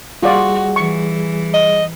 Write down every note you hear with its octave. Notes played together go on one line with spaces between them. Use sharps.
G3 F4 F#4 G#4 D5
E3 C#6
D#5